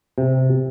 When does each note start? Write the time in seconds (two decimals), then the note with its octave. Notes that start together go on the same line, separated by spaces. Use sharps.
0.18 C3